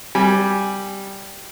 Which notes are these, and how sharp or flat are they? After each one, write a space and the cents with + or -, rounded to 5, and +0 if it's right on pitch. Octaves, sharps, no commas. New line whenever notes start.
G3 +0 G#5 +0